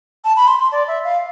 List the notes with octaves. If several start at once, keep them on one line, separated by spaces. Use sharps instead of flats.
A5
B5
C6
C6
D5
E5
F5